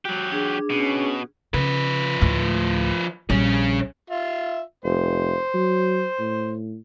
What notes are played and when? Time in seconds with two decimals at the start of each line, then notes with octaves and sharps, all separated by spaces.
0.05 F#3 F#4 G4
0.32 D4 G#4
0.70 B2 C#4
1.54 C#3 F3 B4
2.21 D2 A2
3.30 A#1 G3 C#4 G#4
4.10 F4 E5
4.85 F1 C5
5.54 F#3
6.19 A2